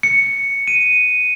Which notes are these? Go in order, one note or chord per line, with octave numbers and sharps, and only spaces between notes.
C#7
D#7